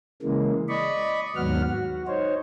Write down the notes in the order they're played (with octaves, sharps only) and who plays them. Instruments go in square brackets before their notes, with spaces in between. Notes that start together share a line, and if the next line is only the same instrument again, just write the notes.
[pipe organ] C#3 E3 G#3 A#3
D5 D#5 B5 C#6
D#2 G#2 F#3 B3 F#5 F6
F#4
D#4 C5 C#5